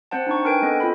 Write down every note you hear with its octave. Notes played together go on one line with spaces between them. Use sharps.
C4 C5 F#5 A5
D4 D#4 C#6
D4 A#4 B4 G5 G#5 D7
B3 C4 A4 D#5
C4 F4 A4 B5